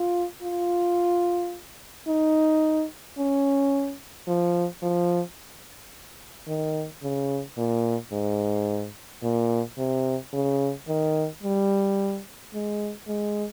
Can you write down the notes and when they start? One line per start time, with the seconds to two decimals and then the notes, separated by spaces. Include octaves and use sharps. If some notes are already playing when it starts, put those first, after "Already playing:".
Already playing: F4
0.42 F4
2.08 D#4
3.18 C#4
4.28 F3
4.83 F3
6.48 D#3
7.03 C#3
7.58 A#2
8.12 G#2
9.23 A#2
9.78 C3
10.33 C#3
10.88 D#3
11.43 G3
12.54 G#3
13.08 G#3